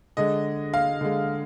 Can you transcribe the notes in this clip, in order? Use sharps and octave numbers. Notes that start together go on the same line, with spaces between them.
D3 G#3 D#5
F5
D3 G#3